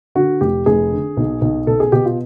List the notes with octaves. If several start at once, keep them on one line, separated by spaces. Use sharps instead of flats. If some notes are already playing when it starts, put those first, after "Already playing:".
D3 F#4
F1 G4
F1 G#4
D3
B1
B1
B2 A4
G#4
B2 G4
F4